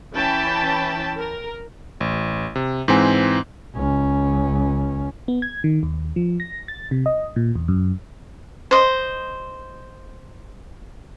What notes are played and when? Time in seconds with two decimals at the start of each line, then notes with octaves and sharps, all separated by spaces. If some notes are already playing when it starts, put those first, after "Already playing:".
0.13 E3 C#4 G5 A5 B5
1.18 A#4
2.00 A1
2.55 C3
2.88 G#2 E3 C4 G#5
3.75 C#2 C#4
5.28 B3
5.42 G#6
5.64 D#3
5.83 D#2
6.16 F3
6.40 A#6
6.68 A6
6.91 C3
7.06 D#5
7.36 A#2
7.55 E2
7.68 F#2
8.71 C5 D#5